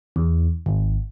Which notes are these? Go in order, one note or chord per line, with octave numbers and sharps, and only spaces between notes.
E2
G#1